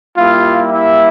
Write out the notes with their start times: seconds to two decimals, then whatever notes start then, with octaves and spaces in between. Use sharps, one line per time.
0.17 G3 A#3 E4 F4 G4 F5
0.70 E4 E5